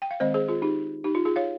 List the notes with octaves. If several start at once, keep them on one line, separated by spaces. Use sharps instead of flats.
G5
F5
D#3 G#3 C4 C5 D#5
G#4 C5
F4 G#4
D#4 G4
D#4 G4
F4
F4 G#4
C#5 F5